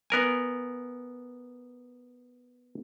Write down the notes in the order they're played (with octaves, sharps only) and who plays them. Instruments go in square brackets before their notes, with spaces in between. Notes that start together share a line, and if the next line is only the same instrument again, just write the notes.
[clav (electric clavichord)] B3 A#4 G#5